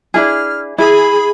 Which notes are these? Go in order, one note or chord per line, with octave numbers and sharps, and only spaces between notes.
D4 E4 G#4 F6
E4 G#4 B5